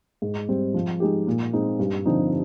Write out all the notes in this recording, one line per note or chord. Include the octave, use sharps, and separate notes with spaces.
G#2
G3 C4
F3
G#3 D#4 G4
A#2
G#3 C4 D#4
G2
D3 F3 C4 D#4